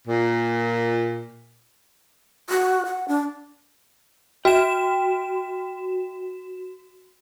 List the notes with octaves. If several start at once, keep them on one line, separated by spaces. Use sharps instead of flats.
A#2
F#4
F#5
D4
F#4 G5 E7